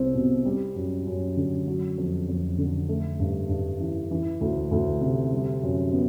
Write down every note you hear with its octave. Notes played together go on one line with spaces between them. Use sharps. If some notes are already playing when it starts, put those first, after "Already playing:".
Already playing: C2 C4
B2
G3
F#2
F#2
D3
F#3
F2
F2
D3
A3
G2
G2
E3
E3
D2
D2
C3
G3
F#2
B3